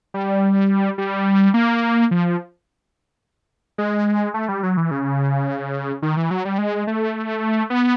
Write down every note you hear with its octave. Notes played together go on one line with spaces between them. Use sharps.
G3
G3
A#3
F3
G#3
A3
G3
F#3
E3
C#3
D#3
E3
F#3
G3
G#3
A3
B3